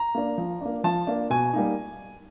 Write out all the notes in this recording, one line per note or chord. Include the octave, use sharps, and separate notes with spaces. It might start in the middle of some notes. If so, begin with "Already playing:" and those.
Already playing: A#5
A#3 D4
F3
A#3 D4
F3 A5
A#3 D4
B2 G#5
G3 A#3 D#4